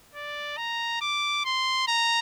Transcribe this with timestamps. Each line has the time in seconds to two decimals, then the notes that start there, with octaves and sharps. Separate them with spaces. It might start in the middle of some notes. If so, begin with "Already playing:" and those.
0.15 D5
0.57 A#5
1.01 D6
1.45 C6
1.88 A#5